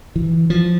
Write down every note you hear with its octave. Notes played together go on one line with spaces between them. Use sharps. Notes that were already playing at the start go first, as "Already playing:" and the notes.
E3
F3